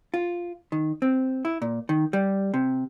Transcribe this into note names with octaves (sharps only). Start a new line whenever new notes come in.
F4
D#3
C4
E4
A#2
D#3
G3
C3